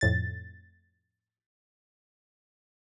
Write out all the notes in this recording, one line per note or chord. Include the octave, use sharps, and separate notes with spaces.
F2 A2 A6